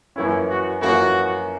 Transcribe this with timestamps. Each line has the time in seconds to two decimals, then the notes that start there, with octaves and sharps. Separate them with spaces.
0.16 F#2 E3 A#3 C#4 E4
0.49 F#4
0.82 F#2 E3 A#3 C#4 F#4